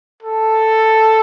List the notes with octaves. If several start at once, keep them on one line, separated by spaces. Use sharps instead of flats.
A4